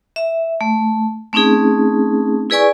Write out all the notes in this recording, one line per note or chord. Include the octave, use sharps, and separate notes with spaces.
E5
A3
A3 C4 C#4 D#4 G#4
E4 G#4 B4 D5 G#5 C#6